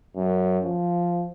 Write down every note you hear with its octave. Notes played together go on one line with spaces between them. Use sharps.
F#2
F3